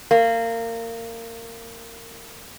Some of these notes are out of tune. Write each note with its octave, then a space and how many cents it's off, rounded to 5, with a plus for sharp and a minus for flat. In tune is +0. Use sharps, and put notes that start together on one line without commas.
A#3 -25